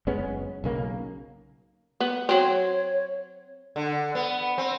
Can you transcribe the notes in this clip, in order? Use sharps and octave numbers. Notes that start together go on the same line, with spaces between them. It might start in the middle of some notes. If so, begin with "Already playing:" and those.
F#1 G#3 B3 C#4
B1 C#3 A#3
B3
F#3 C4 C#5
D3
B3
C4